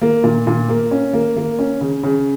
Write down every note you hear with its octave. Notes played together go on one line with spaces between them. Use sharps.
A#3
A#2
A#2
A#3
C#4
A#3
A#3
C#4
C#3
C#3